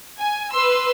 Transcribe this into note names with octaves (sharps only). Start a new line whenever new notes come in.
G#5
B4 C6 E6